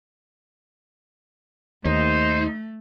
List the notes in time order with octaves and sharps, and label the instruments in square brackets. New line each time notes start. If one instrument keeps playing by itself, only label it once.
[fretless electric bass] D#2 [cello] A3 [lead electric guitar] D#4 [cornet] C5